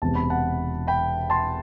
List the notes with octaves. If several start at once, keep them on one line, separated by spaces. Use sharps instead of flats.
E1 E2 C3 A5
B5
F#5 A5
G5 B5
A5 C6